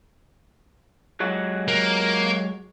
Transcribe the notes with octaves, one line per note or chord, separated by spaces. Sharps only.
F#3 G#3 F#4
A#3